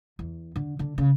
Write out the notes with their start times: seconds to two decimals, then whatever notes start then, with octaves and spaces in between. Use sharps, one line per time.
0.19 E2
0.56 D3
0.79 D3
0.98 C#3